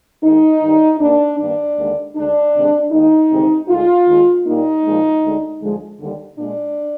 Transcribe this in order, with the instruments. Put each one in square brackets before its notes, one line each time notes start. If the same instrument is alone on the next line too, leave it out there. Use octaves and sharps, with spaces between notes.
[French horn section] D#2 D#3 G#3 D#4
G2 D#3 G3
D#2 D#3 A#3 D4
G2 D#3 A#3 D4
D#2 D3 G#3
D2 D3 G#3 D4
D2 C3 D#3 G#3
D#2 D#3 G#3 D#4
D2 C3 D#3 G#3
D2 D3 G#3 F4
D#2 D#3 G#3
A#2 G3 A#3 D#4
A#2 F3 G#3
D2 D3 G#3
D2 D3 F3 G#3
D#2 D3 G3
A#2 G#3 D4